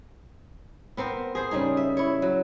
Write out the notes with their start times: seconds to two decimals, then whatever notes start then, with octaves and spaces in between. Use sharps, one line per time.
0.97 B3 C4 A#4 C5
1.35 G#4 C5
1.51 C#3 G3 D#4 G#4
1.77 E5
1.97 E4 C#5
2.22 F#3